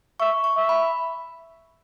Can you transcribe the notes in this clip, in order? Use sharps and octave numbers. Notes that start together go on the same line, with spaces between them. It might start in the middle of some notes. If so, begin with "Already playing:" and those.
E5 C#6
C#6
E5
B5